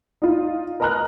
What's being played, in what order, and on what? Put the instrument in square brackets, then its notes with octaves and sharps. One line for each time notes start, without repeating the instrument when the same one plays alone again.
[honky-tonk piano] D#4 F4
A#4 B4 D#5 A#5 F6 F#6